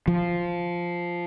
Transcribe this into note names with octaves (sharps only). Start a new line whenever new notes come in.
F3